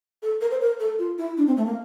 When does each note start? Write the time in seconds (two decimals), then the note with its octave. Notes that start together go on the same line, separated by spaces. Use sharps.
0.23 A4
0.41 A#4
0.51 C5
0.61 A#4
0.80 A4
0.99 F4
1.18 E4
1.37 D4
1.47 C4
1.57 A3
1.66 A#3